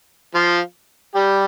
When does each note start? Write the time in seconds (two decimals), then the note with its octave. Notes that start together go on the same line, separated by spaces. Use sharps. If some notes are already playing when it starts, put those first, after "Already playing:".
0.35 F3 F4
1.15 G3 G4